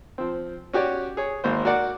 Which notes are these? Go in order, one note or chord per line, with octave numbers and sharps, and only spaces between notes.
F3 C4
C#4 F#4 G4 C#5 D5
G#4 C#5
G#1 A#3 C5
F#4 A#4 D5 F#5